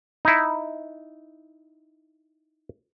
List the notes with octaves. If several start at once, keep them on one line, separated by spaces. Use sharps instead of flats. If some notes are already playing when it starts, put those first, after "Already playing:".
D#4 E4